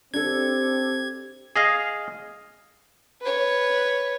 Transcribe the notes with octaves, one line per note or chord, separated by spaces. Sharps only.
C4 D4 G4 A4 G#6
G#4 D#5 F5
B4 C#5